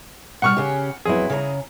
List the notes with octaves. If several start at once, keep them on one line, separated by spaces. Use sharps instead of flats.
B2 G3 F#5 C#6 F6
C#3 C#4 G4
F2 F#3 B3 E4 G#4
C#3 C#5 A#5